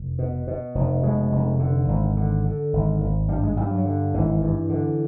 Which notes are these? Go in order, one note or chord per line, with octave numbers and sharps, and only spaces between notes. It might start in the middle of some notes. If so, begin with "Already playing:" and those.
Already playing: F1
B2
B2
F1
B2 G#3
F1
D3
G#1
D3
D3
G#1
G#1
G2 G3
G#3
G2 G3
F#3
D3
G#1 E3
G2
D3